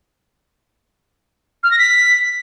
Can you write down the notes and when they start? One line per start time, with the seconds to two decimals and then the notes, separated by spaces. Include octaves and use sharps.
1.63 F6
1.71 A#6
1.79 B6